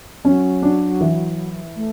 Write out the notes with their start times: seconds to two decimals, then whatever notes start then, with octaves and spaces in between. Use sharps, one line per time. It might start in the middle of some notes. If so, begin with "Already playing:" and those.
0.25 F#3 C#4
0.62 D4
1.00 E3 E4
1.76 A3